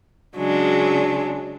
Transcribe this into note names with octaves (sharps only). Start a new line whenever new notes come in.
C#3 F#3 G#3 D4